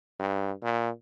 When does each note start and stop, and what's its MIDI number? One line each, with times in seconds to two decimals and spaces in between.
0.20 0.52 43
0.62 0.89 46